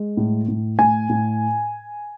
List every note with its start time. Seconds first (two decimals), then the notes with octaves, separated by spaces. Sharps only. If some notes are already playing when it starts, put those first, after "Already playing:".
Already playing: G#3
0.17 A2
0.48 A2
0.79 A2 G#5
1.09 A2